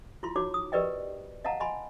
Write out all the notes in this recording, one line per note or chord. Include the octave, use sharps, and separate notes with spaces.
E4 F4 C6
D#4 F#4 C#5 D6
D#6
G4 A#4 B4 D5 D#5 G5
D#5 F5 F#5 A5 A#5
D#5 G#5 B5 C6